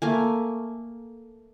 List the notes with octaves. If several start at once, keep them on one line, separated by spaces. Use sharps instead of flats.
A3 A#3 G#5